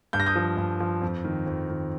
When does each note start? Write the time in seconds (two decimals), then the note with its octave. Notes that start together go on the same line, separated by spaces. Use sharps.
0.13 G2 G6
0.20 A#6
0.26 D#6 G6
0.35 F3
0.57 G2
0.80 F3
1.02 F2
1.24 D#3
1.46 F2
1.70 D#3